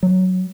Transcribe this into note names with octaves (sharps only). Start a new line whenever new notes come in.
F#3